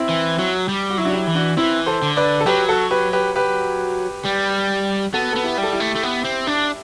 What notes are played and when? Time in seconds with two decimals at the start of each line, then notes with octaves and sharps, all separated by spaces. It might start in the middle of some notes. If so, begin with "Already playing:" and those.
Already playing: C4 E4
0.09 E3
0.39 F#3
0.69 G3
0.90 F#4
0.98 F#3 E4
1.05 D4 F#4
1.12 E4 G4
1.27 E3
1.35 D4 F#4
1.57 E3 C4 E4
1.86 A4 C5
2.02 D3
2.17 B4 D5
2.41 A4
2.46 F#3 G4 B4
2.69 F#4 A4
2.91 G4 B4
3.13 G4 B4
3.36 G4 B4
4.25 G3
5.14 B3 F#4 A4
5.33 B3 A4
5.43 E4 G4
5.58 G3
5.63 A4
5.73 E4 G4
5.80 A3
5.95 A3
6.03 B3
6.25 C4
6.47 D4